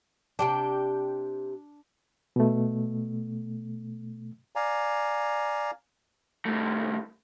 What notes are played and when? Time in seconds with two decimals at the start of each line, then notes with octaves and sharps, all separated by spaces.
0.39 C3 D4 G4 G5
2.36 B2 A3
4.56 D5 F5 G#5 A#5
6.46 C2 A3